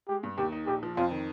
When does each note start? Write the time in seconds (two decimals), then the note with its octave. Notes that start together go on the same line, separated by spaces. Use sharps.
0.08 G#3 G4
0.23 G2
0.38 D#2 G4
0.52 D#4
0.67 A#1 G4
0.83 F3
0.97 F2 F4
1.11 D#3